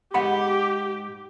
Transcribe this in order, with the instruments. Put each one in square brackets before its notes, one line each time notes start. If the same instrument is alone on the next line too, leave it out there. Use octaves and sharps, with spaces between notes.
[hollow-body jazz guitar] G#2 F#5 B5 [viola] G4